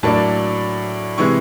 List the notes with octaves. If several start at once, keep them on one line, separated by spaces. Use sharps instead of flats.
A2 F#3 A#3 D4 A5
C3 E3 G#3 C#6